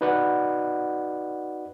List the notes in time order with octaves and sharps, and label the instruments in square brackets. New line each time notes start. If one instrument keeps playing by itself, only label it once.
[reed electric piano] D#4 F#4 B4 D5 D#5 F#5